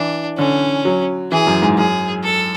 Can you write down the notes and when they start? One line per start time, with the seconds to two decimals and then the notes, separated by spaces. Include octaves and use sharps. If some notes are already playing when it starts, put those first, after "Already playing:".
Already playing: E3 D4
0.38 D3 C#4
0.85 F#3
1.32 E3 G#4
1.47 F#2
1.62 G#2
1.77 F#2 G#4
2.24 A4